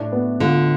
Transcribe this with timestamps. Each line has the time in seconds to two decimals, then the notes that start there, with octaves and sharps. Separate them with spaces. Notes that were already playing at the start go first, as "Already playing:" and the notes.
Already playing: A2 D4
0.12 B3
0.40 D3 F4